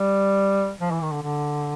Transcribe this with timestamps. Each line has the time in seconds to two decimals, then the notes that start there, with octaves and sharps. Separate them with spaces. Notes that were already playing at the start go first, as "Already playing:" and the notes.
Already playing: G3
0.81 F3
0.91 E3
1.02 D#3
1.12 D3
1.23 D3